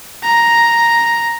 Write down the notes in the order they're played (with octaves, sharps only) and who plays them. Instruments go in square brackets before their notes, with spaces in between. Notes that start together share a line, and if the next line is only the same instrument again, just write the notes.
[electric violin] A#5